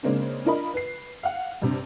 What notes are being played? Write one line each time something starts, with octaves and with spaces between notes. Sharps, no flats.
C#3 G#3 A#3 C4 D4
D4 F4 A#4 D#5 B5
B4 C7
F5 F#5
G2 C3